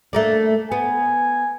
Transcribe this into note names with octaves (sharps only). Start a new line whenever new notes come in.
A3 A#3 D4
B3 G#5